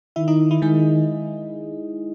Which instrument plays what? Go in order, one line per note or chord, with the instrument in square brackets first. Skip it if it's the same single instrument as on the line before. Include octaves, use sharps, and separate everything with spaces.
[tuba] D#3 [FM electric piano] E4 E5
[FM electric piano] D#4 D#5
E4
[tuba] D#3 [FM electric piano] G#3 G#4